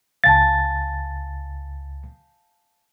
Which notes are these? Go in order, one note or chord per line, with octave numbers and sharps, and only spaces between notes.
C#2 F5 G#5 A5 A6